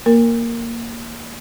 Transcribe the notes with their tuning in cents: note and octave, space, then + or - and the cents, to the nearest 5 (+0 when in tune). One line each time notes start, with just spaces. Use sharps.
A#3 +0 A#4 -10